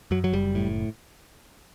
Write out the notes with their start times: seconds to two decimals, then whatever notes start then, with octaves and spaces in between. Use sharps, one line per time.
0.11 F#2 F#3
0.24 F#3
0.33 F#1 G3
0.55 A2